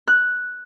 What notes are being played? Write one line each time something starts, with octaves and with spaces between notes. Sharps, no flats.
F#6